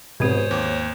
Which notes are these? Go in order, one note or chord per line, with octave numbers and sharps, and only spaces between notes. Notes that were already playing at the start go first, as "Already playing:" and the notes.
G#2 B2 D#3 C4 G4 C5 C#5
D#2 D6